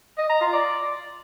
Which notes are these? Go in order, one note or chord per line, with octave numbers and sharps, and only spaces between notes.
D#5
A#5
F4
D5